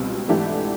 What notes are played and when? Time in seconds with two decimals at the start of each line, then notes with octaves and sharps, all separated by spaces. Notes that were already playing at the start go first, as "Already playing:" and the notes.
Already playing: C#2 B2 G3 C4
0.28 G#2 E3 A3 D4 G4